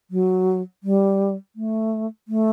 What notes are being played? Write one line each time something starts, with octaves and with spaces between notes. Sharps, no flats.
F#3
G3
A3
A3